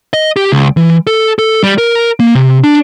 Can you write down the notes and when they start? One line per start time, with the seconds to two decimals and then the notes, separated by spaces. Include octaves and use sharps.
0.13 D#5
0.36 G4
0.52 C#2
0.77 E3
1.07 A4
1.39 A4
1.64 G3
1.78 A#4
2.20 A#3
2.35 C3
2.64 D4